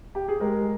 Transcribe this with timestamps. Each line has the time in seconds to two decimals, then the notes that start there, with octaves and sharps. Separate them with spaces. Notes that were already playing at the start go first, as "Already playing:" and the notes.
0.15 G4
0.29 G#4
0.41 G#3 A#4